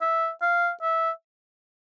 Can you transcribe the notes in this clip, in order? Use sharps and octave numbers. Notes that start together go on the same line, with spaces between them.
E5
F5
E5